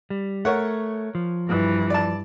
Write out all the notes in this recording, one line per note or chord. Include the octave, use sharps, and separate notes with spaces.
G3
A3 A#4 C#5 F#5
F3
G2 E3
D5 A5